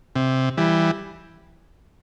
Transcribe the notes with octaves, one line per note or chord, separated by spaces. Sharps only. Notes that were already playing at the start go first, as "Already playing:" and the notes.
C3
E3 G3